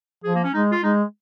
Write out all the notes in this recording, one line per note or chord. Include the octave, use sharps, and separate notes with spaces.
F3 G#4
A#3
C#4
G#3 D#4
F4
G#3 D#4